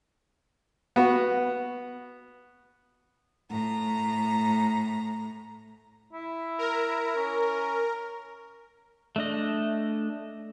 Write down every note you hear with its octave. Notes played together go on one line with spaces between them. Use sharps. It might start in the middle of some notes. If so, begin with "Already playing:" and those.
B3 F#4
A2 A#5
E4
A#4
C#4
A3 D4 D#5